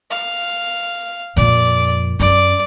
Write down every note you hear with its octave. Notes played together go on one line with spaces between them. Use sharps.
F5
F2 A#2 D5
F#2 D5